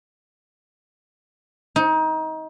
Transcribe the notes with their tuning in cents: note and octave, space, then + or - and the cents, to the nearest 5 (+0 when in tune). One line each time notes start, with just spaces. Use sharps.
D#4 +25